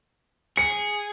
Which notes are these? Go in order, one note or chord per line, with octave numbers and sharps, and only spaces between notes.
G#4 C#7